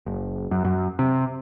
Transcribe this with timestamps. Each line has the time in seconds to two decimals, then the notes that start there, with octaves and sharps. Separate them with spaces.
0.06 F#1
0.51 F#2
0.65 F#2
0.99 C3